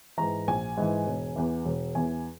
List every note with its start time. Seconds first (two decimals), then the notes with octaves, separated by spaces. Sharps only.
0.18 G#2 E3 A#5
0.48 A#1 G#5
0.77 G#2 E3
1.07 E1
1.36 E2 E3
1.65 E1
1.95 E2 E3 G#5